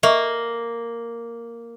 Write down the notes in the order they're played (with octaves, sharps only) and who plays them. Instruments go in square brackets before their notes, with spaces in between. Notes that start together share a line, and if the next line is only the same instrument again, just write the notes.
[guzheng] A#3 [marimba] D#5 E5 C#6